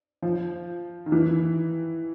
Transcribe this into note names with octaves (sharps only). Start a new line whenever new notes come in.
F3
D#3
E3